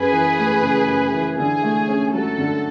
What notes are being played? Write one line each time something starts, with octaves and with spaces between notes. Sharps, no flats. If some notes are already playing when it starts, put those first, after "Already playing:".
Already playing: F#2 G#4 B4
E3
A3
C#3
F#2
E3
D3 G#4
A3
C#4
F#3 A4
D3